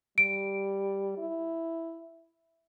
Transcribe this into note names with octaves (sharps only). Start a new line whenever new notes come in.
G3 D7
E4